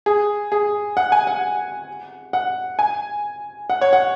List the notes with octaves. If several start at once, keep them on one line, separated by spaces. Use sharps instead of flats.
G#4
G#4
F#5
G#5
F#5
F#5
G#5
F#5
C#5
F#5